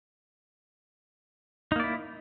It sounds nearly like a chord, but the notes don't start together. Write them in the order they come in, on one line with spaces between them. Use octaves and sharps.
D#4 A#3 D5 E4